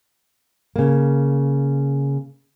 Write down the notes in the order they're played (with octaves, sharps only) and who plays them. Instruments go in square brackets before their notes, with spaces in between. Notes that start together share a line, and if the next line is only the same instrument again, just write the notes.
[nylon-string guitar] C#3 A#3